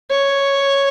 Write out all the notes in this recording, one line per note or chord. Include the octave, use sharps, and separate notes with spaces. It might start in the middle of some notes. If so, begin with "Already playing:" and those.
C#5